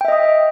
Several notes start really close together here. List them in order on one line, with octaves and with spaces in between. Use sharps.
G5 E5 D#5 D#6